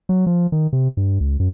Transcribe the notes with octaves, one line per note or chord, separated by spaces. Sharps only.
F#3
F3
D#3
C3
G2
C#2
F#2